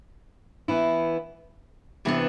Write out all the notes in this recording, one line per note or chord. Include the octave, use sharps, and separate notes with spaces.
E3 B3 E4
C3 E3 B3 D4